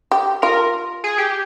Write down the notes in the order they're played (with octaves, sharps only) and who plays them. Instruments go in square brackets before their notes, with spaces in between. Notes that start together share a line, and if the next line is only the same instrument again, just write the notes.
[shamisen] G4
[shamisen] F4 [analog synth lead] A#4
[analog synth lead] G#4
G4